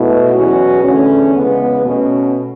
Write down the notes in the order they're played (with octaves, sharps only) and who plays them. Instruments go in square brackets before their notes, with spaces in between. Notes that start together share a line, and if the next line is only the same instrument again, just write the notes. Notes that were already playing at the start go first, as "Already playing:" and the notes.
Already playing: [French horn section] B2 A3 E4
E2 B2 F#3 C#4 F#4
E2 D3 A3 C#4
E2 C#3 G#3 B3
B2 A3 C#4